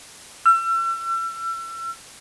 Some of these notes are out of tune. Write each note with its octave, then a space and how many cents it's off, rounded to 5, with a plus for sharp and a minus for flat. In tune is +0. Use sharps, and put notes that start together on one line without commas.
E6 +40